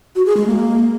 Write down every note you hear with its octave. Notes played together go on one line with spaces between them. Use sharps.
F#4
G#4
G#3
A#3